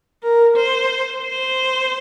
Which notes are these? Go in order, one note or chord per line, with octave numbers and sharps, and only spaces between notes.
A#4
C5
C5